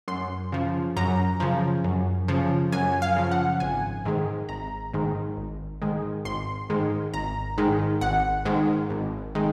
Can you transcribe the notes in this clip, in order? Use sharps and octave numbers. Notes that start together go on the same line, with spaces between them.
F#2 C6
C#3 F3
F#2 A#5
C#3 F3
F#2
C#3 F3
F#2 G#5
F5
C#3 F3
F#5
G#1 G#5
G#2 D#3 G#3
G#1 A#5
G#2 D#3 G#3
G#1
G#2 D#3 G#3
G#1 C6
G#2 D#3 G#3
G#1 A#5
G#2 D#3 G#3
G#1 F#5
G#2 D#3 G#3
G#1
D#3 G#3